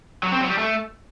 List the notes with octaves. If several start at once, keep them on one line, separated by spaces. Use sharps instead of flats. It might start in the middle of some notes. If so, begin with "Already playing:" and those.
F#3
C4
F#3
G3
A3